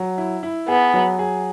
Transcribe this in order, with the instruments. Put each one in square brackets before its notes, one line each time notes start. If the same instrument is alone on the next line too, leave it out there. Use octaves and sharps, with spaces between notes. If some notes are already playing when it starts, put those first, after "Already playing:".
Already playing: [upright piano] F#3
E4
E4
[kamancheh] B3 [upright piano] G#4
[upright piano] F#3
G#4